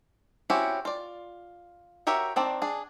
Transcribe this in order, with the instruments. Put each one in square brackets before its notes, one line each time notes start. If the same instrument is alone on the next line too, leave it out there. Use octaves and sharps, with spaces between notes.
[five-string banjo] C4 C#4 E4 F#4 G4
F4 D5
F#4 G4 A#4 C#5 E5
D#3 C4 D4 D5
D4 G#4